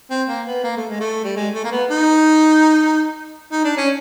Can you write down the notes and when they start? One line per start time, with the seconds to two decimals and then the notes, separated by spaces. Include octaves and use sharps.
0.10 C4
0.28 A#3
0.46 B3
0.63 A#3
0.76 A3
0.89 G#3
1.00 A3
1.24 G3
1.36 G#3
1.54 A3
1.64 A#3
1.72 B3
1.90 D#4
3.52 D#4
3.64 D4
3.77 C#4